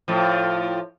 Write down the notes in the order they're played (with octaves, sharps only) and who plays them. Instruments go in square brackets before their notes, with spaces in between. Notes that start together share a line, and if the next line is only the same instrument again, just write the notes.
[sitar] A2 F3